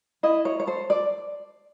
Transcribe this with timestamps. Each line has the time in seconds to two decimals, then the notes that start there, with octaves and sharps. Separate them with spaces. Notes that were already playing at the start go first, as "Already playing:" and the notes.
0.23 E4 D#5
0.45 C#5
0.60 C#5
0.67 A4 C5
0.90 D5